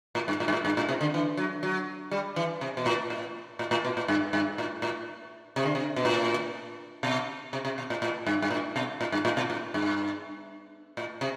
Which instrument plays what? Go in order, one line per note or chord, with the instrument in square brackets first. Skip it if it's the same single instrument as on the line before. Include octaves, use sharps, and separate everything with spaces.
[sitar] A2
G2
A2
G2
A2
G2
A2
C3
D3
E3
F#3
F#3
G3
E3
C3
B2
A2
A2
A2
A2
B2
A2
G2
G2
A2
A2
C3
D3
C3
B2
A2
B2
C3
C3
B2
A2
A2
G2
G2
A2
B2
A2
G2
A2
B2
A2
G2
A2
C3